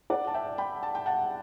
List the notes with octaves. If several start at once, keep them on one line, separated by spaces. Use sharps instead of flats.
D5 F#5
A5
E5 G5
G5 B5
A5
G5
F#5 A5